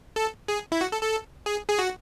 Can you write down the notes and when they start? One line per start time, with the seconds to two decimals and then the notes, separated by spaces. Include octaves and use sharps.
0.16 A4
0.48 G#4
0.72 E4
0.81 F#4
0.92 A4
1.03 A4
1.46 G#4
1.68 G#4
1.79 F#4